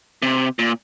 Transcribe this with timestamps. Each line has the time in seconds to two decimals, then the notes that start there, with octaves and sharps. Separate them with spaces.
0.22 C3
0.59 A#2